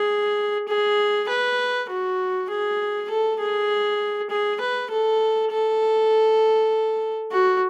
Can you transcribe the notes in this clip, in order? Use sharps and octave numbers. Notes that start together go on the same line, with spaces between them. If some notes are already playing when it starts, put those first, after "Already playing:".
Already playing: G#4
G#4
B4
F#4
G#4
A4
G#4
G#4
B4
A4
A4
F#4